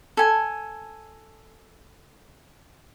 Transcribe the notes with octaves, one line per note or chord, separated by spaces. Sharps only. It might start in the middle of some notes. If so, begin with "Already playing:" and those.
A4 G#5